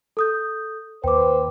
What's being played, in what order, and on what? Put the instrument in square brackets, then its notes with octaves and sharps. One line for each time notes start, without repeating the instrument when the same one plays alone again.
[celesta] A4 D#6 G6
[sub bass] D#2 [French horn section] B4 C5 [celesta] G5 D6